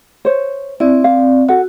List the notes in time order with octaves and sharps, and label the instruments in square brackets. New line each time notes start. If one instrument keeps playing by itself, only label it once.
[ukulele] C5 C#5
[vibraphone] C4 D5 [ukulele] E4
[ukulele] F5
[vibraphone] F#4 [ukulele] A4 F#5